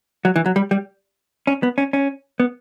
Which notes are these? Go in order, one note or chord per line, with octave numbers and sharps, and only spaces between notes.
F#3
E3
F#3
G3
G3
C#4
B3
C#4
C#4
B3